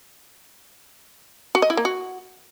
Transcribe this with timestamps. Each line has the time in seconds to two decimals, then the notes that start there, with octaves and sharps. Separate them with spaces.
1.55 F#4
1.62 D#5
1.70 E4
1.77 A#3
1.85 F#4